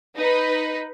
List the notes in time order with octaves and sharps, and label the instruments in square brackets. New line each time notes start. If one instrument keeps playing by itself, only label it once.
[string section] D#4 B4